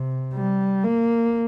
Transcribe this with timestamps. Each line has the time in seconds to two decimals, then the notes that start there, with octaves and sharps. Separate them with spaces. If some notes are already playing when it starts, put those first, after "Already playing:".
Already playing: C3
0.34 G3
0.84 A#3